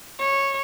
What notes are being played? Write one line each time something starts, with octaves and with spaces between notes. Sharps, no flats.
C#5